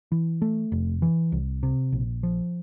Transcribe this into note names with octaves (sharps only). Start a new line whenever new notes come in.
E3
A3
F1
E3
C2
C3
A#1
F3